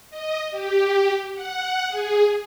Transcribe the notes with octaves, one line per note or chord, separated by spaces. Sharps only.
D#5
G4
F#5
G#4